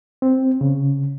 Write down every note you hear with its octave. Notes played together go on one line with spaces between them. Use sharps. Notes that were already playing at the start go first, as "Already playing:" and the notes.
C4
C#3